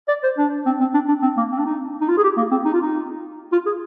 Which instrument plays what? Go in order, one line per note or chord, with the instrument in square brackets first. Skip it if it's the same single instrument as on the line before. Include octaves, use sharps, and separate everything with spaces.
[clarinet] D5
C5
D4
C4
C4
D4
D4
C4
A#3
C4
D4
D#4
D#4
F4
G#4
G4
A#3
C4
D#4
F4
D#4
F4
G#4